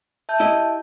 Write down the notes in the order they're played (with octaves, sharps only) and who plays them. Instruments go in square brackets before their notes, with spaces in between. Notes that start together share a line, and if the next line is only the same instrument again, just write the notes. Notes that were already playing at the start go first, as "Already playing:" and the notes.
[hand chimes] E5 A5 G6
[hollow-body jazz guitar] E4 G4 D#5